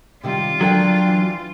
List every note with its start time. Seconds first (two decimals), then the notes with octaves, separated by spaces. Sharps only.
0.23 C3 D#3 G3 F4
0.61 D3 F#3 D4 A#4 G5
1.08 E3